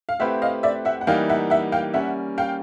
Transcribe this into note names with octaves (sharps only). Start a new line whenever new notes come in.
F5
A3 C4 E4 G4 B4 E5 F#5
D#5 F5
D5 E5
E5 F#5
F#5
E3 G3 A#3 D#4 F5 G5
E5 F#5
E5 F#5
F5 G5
G3 A#3 C#4 E5 F#5
F5 G5